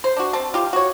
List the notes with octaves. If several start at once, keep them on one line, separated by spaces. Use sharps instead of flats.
C5
D4 F#4
C4 A5
F4 G4
F#4 C#5